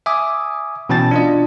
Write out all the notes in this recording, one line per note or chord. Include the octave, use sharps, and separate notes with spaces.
E5 G#5 D6 D#6
B2 E3 C#4 G5 A5 A6
D4 F4 D#5